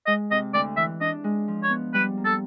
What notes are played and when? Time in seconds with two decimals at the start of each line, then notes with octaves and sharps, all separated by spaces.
0.07 G#3 D#5
0.31 C3 D#5
0.54 D2 D5
0.77 E3 E5
1.01 D4 D#5
1.24 G#3
1.48 F3
1.63 C#5
1.70 B3
1.94 G3 B4
2.17 A#3
2.25 A4